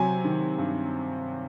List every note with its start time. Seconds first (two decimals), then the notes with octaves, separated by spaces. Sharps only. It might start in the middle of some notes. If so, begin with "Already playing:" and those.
Already playing: C3 F#3 G#5
0.24 D#3
0.58 G2